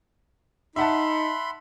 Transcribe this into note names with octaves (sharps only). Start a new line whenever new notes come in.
D#4 E5 F#5 A5 B5 C6